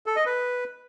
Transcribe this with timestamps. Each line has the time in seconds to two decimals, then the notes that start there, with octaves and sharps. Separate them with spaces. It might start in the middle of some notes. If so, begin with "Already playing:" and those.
0.06 A4
0.16 D#5
0.26 B4